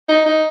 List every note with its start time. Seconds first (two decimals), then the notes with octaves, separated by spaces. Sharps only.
0.08 D#4
0.26 D#4